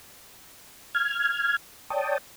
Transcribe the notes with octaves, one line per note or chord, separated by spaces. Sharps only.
F6 G#6
C#5 D5 G5 A5 D#6